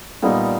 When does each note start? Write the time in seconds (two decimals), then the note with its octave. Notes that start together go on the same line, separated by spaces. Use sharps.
0.23 A#2 G3 B3 D#4